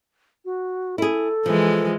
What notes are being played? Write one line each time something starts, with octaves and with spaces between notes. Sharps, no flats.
F#4
E4 G#4 A4
E3 F3 G#3